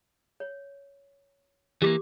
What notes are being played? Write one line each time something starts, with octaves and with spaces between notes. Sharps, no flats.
C#5
E3 G3 A#3 G4 D6